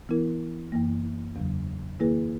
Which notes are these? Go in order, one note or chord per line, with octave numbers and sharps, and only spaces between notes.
E3 B3 E4 A#4
F#2 E3 A#3
E2 C#3 F#3
D#3 A#3 E4 G#4 B4